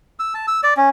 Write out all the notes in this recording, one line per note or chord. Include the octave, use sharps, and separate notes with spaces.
E6
A5
E6
D5
C#4